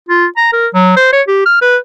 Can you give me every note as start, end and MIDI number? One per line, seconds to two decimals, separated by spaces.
0.09 0.26 65
0.37 0.48 82
0.53 0.67 70
0.74 0.93 54
0.96 1.12 72
1.12 1.22 73
1.28 1.41 67
1.46 1.59 89
1.61 1.77 71